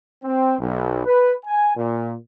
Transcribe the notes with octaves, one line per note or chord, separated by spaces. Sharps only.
C4
B1
B4
G#5
A#2